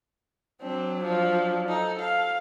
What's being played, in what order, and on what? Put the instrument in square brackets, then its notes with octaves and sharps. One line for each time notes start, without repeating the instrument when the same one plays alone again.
[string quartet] F#3 D4 [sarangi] C4
[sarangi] F3
[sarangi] D#4 [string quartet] A4
[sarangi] F5